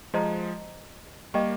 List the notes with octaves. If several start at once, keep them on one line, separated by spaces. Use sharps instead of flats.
F3 G#3 G4 C5 D#5 A#5
G3 A#3 A#4 D#5 G5 C#6